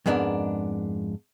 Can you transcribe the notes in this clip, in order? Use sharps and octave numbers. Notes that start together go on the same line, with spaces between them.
F2 G#2 G#3 B3 D4 A#4